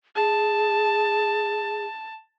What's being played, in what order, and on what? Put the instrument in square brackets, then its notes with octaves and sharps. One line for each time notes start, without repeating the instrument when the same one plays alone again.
[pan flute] G#4 [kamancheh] A5